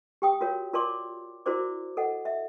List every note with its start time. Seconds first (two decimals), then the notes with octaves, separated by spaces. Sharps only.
0.22 G4 G5 D#6
0.41 F4 F#4 A#4 C#5 F5
0.73 F4 A#4 D5 A5 C6 D6
1.46 E4 F#4 A#4 C5 D5 D6
1.97 A4 D#5 F#5
2.25 E5